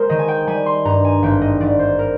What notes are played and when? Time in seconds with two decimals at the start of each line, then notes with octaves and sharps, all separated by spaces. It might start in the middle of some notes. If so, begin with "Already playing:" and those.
Already playing: G#3 A#4 C5
0.09 D#3 D#5
0.19 G#5
0.28 G5
0.47 G3 G#5
0.66 C6
0.85 G2 A#5
1.05 G#5
1.22 G#1 G5
1.41 D#5
1.60 G#1 D5
1.79 C5
1.99 A#4